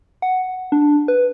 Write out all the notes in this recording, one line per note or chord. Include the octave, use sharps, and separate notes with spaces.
F#5
D4
B4